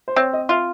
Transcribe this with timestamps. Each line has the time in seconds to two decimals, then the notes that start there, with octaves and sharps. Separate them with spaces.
0.08 C5
0.16 C4 C#5
0.33 D#5
0.49 F4 E5